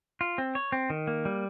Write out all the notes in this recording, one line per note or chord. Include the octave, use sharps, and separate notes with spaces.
F4
C4
C#5
C4
D#3
A#3
G3